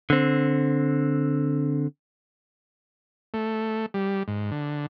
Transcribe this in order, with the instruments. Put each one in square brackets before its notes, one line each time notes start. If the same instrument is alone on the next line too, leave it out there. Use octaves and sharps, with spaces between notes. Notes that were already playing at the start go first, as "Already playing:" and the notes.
[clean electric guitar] D3 C4
[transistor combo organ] A3
G3
G#2
D3